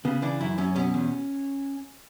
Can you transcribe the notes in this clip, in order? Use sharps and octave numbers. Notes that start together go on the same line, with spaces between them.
C#3 B3
E3 D4
F#2 E4
F#2 C#4
B2 C#4
E2